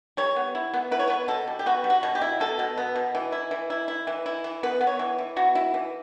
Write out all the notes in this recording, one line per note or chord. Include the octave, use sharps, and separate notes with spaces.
G3 C#5
B3
E4
B3
E4 B4
C#5
B3 B4
B2 A4
G3
G4
B3 F#4
G3
F#4
B2
G4
E4
B2 A4
B2
B3
B2
E3
E4
E3
E4
E4
E3
E4
E3
B3 B4
B3
C#5
E3
E3
B3 F#4
E4
E3